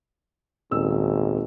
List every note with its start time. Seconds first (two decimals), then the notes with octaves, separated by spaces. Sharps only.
0.71 D#1 G#1 E6